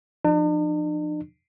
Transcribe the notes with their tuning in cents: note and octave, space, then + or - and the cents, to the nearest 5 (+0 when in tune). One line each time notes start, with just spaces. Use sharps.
F3 +0 D4 +45